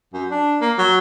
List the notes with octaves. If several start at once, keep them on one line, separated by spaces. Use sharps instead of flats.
F#2
D4
A#3
F#3